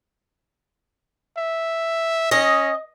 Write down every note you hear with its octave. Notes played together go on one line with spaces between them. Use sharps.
E5
C#4 D#5